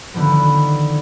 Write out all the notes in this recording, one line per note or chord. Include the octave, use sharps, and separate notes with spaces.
D3 D#3 F3 B3